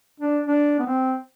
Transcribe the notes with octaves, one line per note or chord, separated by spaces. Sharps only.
D4
D4
B3
C4